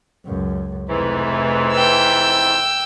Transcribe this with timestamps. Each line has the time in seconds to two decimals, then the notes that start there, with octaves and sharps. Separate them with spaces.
0.25 C#2 F#2
0.89 F1 F2 G#2 E3
1.73 G5 E6